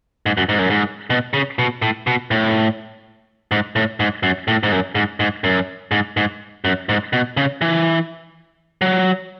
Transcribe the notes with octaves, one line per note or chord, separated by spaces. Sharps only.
G#2
F#2
G#2
F#2
G#2
B2
C#3
B2
A2
B2
A2
G#2
A2
G#2
F#2
A2
G#2
F#2
G#2
G#2
F#2
G#2
G#2
F#2
G#2
B2
C#3
E3
F#3